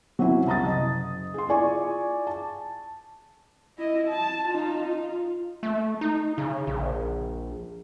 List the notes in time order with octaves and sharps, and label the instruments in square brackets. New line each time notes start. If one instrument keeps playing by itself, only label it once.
[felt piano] F#3 C4 C#4 E4
C2 A5 A#5 D#6 A6
F#1 D#5
G#4 C6
E4 F4 G#4 D5 G#5 C#6
A5
[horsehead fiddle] E4 D#5
A5
D#4 F4
F4
[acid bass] A3
D#4
C#3
A#1